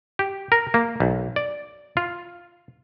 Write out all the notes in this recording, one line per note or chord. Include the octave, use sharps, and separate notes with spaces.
G4
A#4
A#3
B1
D5
F4